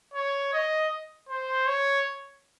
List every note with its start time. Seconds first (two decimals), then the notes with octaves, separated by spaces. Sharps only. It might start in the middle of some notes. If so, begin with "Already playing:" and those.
0.14 C#5
0.53 D#5
1.29 C5
1.67 C#5